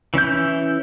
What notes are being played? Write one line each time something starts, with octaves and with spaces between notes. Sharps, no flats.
E3 C#4 E4 G6